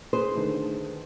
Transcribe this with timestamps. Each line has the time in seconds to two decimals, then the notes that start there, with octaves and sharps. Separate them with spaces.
0.13 G#4 B4 C5
0.35 D3 D#3 A3